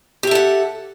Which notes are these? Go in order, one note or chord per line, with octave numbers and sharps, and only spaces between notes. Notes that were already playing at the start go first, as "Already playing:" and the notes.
G4 A4 E5 F#5